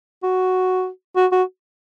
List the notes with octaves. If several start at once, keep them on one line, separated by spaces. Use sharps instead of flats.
F#4
F#4
F#4